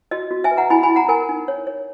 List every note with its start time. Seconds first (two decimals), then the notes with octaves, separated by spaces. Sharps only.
0.11 F#4 D#5
0.31 F#4
0.44 E5 G#5
0.51 B4
0.57 F#5 A#5
0.70 E4 G#5 B5
0.83 G#5 B5
0.90 E4
0.96 F#5 A#5
1.09 A#4 G#5 B5
1.29 D#4
1.48 C#5
1.67 C#5